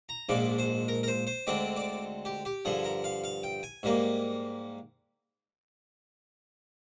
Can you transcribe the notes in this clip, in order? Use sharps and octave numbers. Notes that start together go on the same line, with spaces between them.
A#5
A#1 G#2 F3 G#3 D5
C5
A#4
A#4
C5
C5
D2 D3 G#3 C4 D5
D5
G4
G4
G2 D3 F3 G#4
A#4
F5
F5
G5
G#5
G#2 G3 A#3